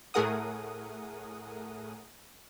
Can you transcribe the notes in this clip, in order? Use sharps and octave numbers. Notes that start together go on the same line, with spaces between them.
A2 A3 G#4 A#4 F#5 D#6